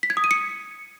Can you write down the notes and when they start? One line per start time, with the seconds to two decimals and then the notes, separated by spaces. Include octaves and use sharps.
0.03 B6
0.10 G#6
0.17 D#6
0.24 D#7
0.31 C#7